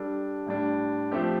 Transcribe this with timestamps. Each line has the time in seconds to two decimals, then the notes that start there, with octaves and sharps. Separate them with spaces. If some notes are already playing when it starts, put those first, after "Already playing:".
Already playing: G3 D4 A4
0.46 A2 G3 D4
1.11 F3 A3 C4 G4